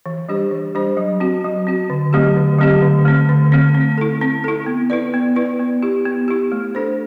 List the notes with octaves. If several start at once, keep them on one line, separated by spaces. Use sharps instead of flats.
E3
G3 D4 G4 C5
E3
G3 D4 G4 C5
F#3
C4 F#4
F#3
C4 F#4
D3
F#3 A3 C4 G4
D3
F#3 A3 C4 G4
D3
A3 C4
D3
A3 C4
C4
E4 A4
C4
E4 A4
B3
E4 B4 D5
B3
E4 B4 D5
B3
E4 G4
B3
E4 G4
A3
D4 A4 C5